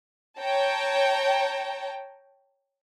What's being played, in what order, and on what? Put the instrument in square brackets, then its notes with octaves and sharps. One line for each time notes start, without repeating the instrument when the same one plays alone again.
[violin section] C#5 G5 A5 A#5